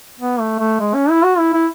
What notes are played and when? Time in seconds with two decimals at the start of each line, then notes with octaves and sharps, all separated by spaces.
0.20 B3
0.40 A3
0.60 A3
0.80 G#3
0.94 C#4
1.10 E4
1.24 F#4
1.38 E4
1.54 E4